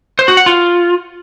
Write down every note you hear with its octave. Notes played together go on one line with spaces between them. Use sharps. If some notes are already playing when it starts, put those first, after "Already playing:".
C5
F#4
F#5
F4